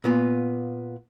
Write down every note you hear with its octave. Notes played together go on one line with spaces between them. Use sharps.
A#2 B3 F4